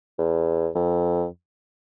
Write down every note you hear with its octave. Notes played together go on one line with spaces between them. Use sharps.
E2
F2